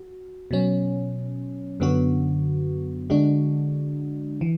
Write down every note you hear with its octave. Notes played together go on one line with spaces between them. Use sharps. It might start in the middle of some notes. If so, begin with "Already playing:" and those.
Already playing: F#4
B2 F#3 C#4
F#2 D3 F#3 B3 F#4
D3 G#3 D4 F#4
E3